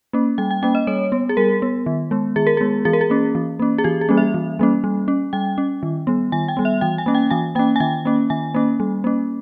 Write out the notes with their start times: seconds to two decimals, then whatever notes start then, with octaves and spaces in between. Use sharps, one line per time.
0.13 A#3 C#4
0.38 G3 G5
0.51 G5
0.63 A#3 C#4 G5
0.75 D#5
0.87 G3 C#5
1.12 B3
1.29 G#4
1.37 G3 A#4
1.62 B3
1.86 D#3
2.11 G#3 B3
2.36 D#3 G#4
2.47 A#4
2.57 G#3 B3 G#4
2.85 E3 G#4
2.93 A#4
3.01 G#4
3.10 A#3 C#4
3.35 E3
3.59 A#3 C#4
3.78 G#4
3.84 E3 G4
4.01 G#4
4.09 G3 A#3 C#4
4.17 E5
4.34 E3
4.59 G3 A#3 C#4
4.84 G3
5.08 C#4
5.33 G3 G5
5.58 C#4
5.83 D#3
6.07 G3 B3
6.32 D#3 G#5
6.48 G5
6.57 G3 B3
6.65 E5
6.81 E3 G5
6.98 G#5
7.06 A#3 C#4
7.15 G5
7.31 E3 G#5
7.55 A#3 G5
7.59 C#4
7.76 G#5
7.80 D#3 G5
8.05 A#3 C#4
8.30 D#3 G#5
8.54 A#3 C#4
8.80 G3
9.04 A#3 C#4